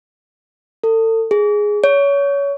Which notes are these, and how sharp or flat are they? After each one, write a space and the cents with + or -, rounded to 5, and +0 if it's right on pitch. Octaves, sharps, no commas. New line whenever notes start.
A4 +35
G#4 +0
C#5 +25